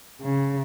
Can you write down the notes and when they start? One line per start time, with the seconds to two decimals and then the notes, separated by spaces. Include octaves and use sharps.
0.22 C#3